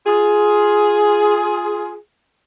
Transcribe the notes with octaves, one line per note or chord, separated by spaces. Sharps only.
F4 G#4